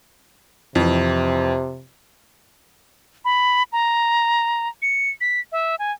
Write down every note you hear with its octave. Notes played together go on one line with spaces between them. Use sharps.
F2 C3 E3
B5
A#5
C#7
B6
E5
G#5